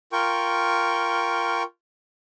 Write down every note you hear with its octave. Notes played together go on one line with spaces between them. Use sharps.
F4 A#4 G5 C#6